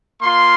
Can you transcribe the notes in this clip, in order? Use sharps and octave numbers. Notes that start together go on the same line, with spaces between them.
A#3 F4 C6